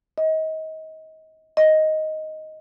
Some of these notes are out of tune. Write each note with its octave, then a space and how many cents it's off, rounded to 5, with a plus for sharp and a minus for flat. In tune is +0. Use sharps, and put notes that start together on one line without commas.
D#5 +30
D#5 +5